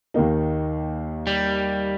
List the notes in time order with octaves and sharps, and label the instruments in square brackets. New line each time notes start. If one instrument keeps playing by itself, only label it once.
[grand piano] D#2 D#3 A#3 D#4
[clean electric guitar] G3